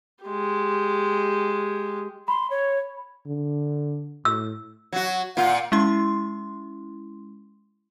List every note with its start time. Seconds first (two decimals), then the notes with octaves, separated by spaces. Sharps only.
0.25 G#3 G4
2.28 B5 C6
2.50 C#5
3.27 D3
4.25 A2 E6
4.92 F#3 F#4
5.37 A#2 F4 F#5
5.72 G#3 C#4 E4 C6